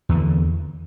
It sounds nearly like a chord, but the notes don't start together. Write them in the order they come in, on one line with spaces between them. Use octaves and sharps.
E2 E3 D3